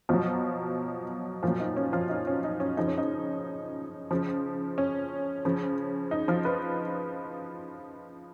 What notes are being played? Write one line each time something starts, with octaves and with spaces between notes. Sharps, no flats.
B2 F3 F#3 F4
A#2 F3 F4
F#3
D#4
C#4
F3 F4
D#4
C#4
D#4
C#4
C#3 F3 D#4
C#4
D#4
C#3 F3
C#4
C#3 F3
D#4
F3 F4
B4